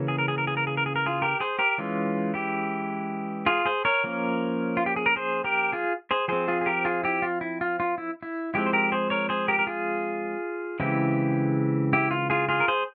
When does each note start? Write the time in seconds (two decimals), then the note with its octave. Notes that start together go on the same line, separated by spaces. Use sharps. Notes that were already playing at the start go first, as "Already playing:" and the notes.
Already playing: C#3 E3 A#3 C#4
0.08 G#4
0.18 A#4
0.28 G#4
0.38 A#4
0.47 G#4
0.57 A#4
0.67 G#4
0.77 A#4
0.86 G#4
0.96 A#4
1.06 F4 G#4
1.22 G4 A#4
1.40 G#4 C5
1.59 G4 A#4
1.78 E3 G#3 C#4 F4
2.34 E4 G4
3.46 F4 G#4
3.66 G#4 C5
3.85 A#4 C#5
4.04 F3 A#3 C#4
4.77 F4
4.86 G4
4.96 G#4
5.06 A#4
5.16 G#4 C5
5.44 G4 A#4
5.72 F4 G#4
6.11 G#4 C5
6.28 F3 C4 G#4 C5
6.48 F4 G#4
6.61 G#4
6.66 G4 A#4
6.85 F4 G#4
7.03 E4 G4
7.22 F4
7.41 E4
7.61 F4
7.80 F4
7.98 E4
8.23 E4
8.54 F3 G#3 C4 E4 G4
8.66 C5
8.73 G4 A#4
8.92 G#4 C5
9.10 A#4 C#5
9.29 G#4 C5
9.48 G4 A#4
9.59 A#4
9.67 F4 G#4
10.80 C#3 E3 G#3 C4 E4 G4
11.93 E4 G4
12.11 F4
12.30 F4 G#4
12.49 F4 G#4
12.60 A#4
12.68 G#4 C5